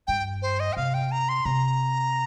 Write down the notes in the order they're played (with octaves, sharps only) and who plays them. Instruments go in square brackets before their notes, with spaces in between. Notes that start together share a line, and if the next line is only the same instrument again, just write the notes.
[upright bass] G2 [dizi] G5
[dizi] C5
D#5
G5
[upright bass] C3 [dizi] F5
[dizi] G5
A#5
C6
[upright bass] C3 [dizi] A#5